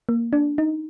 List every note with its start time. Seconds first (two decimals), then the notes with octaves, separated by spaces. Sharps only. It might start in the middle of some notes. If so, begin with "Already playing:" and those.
0.09 A#3
0.33 D4
0.58 D#4